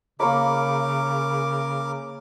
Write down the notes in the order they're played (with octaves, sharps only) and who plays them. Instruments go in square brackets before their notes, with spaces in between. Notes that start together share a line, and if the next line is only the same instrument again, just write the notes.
[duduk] C#3 [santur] A#3 C#5 B5 [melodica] A#4 D6